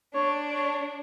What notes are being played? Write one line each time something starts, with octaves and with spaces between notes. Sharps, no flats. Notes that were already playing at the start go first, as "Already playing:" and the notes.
D4 C#5
C#5